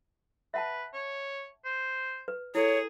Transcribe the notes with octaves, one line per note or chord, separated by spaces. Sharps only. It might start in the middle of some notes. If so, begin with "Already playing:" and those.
B4 E5 F#5 A5
C#5
C5
B4
E4 G#4 A4 C#5